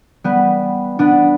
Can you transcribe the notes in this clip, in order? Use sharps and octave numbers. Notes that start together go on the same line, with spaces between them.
G3 B3
B3 D4